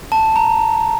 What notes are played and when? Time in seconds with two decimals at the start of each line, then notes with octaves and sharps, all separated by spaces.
0.12 A5
0.36 A#5